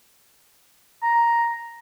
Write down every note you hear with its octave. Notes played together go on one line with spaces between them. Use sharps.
A#5